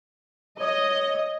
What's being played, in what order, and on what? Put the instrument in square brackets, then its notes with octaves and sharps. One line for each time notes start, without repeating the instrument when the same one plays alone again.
[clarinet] C#5 [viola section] D#5